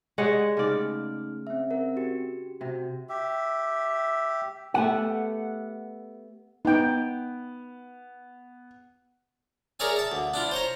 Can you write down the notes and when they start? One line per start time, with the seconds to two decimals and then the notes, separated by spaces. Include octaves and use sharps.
0.18 G#3 G4 C#5 D5 F#5
0.57 C#3 A3 D#4 D5 F6
1.47 C4 E5
1.71 C4 A#4
1.96 F#4 G4
2.61 C3 F#4
3.09 G4 E5
4.74 A3 B3 G4 F#5
6.65 B3 D#4 G5
9.80 G#4 A#4 C#5 D5 E5 G#5
9.96 E5 A5
10.12 D2
10.34 D4 E4 F4
10.51 C5 C#5 A#5